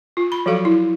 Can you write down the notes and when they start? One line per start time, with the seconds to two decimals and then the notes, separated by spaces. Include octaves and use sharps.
0.17 F4
0.32 B5
0.46 F3 F#3 F#4 A4 F5
0.65 E4